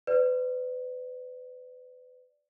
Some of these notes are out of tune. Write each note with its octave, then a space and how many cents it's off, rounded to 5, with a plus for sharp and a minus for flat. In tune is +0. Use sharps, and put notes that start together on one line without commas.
B4 +35 D5 +0